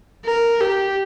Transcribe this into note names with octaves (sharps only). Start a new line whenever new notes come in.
A#4
G4